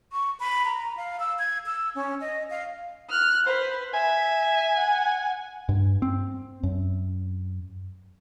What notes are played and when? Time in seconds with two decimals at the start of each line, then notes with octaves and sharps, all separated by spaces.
0.12 C#6
0.40 B5
0.65 A#5
0.97 F5
1.20 E6
1.39 G#6
1.66 E6
1.95 C#4
2.21 D#5
2.50 F5
3.10 F6 F#6
3.46 B4 C5
3.94 E5 G#5
4.76 F#5
5.69 G2
6.02 C4
6.63 F#2